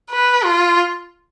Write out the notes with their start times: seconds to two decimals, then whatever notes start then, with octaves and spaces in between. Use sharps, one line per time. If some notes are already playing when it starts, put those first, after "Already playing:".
0.10 B4
0.44 F4